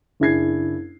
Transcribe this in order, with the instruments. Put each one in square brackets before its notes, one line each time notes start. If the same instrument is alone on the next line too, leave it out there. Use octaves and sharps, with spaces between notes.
[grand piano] F#1 D4 E4 G#4 G#6 C7